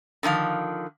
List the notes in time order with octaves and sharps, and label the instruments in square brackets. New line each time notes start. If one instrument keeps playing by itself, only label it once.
[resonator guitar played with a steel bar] D3 D#3 F3 F5